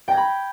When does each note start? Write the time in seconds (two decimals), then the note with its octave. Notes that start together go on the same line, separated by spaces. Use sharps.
0.08 G5
0.11 A#6
0.14 G#6
0.17 B5